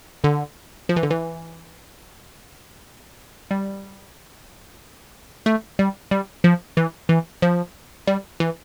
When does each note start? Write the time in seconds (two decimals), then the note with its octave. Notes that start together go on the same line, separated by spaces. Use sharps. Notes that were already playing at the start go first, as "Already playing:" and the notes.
0.24 D3
0.89 F3
0.96 E3
1.03 D3
1.11 E3
3.51 G3
5.46 A3
5.79 G3
6.11 G3
6.44 F3
6.77 E3
7.09 E3
7.42 F3
8.07 G3
8.40 E3